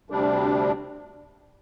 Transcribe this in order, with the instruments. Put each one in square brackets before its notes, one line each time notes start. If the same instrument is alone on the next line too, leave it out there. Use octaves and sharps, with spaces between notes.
[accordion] D2 C3 G3 D4